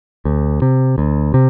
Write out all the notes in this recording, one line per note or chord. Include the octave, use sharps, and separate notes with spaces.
D2
C3
D2
C3